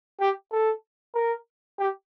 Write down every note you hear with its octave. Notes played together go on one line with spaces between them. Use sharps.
G4
A4
A#4
G4